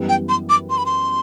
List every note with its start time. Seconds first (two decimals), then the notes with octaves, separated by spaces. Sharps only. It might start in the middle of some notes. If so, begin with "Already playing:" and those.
Already playing: F#2 E3 G3 B3
0.09 G5
0.29 C6
0.49 D6
0.70 C6
0.78 B5
0.86 C6